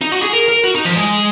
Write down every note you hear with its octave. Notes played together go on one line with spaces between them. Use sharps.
D#4
F#4
G#4
A#4
A#4
F#4
D#4
F3
G#3